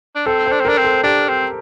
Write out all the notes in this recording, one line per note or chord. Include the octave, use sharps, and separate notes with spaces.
D4
C4 A4
C5
D4
C4
D4 A#4
C4
A4
D4 G4
C4